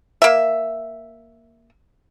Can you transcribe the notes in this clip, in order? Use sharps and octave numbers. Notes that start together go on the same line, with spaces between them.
A#3 E5